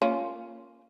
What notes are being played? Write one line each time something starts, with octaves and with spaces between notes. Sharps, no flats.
A#3 C#4 F4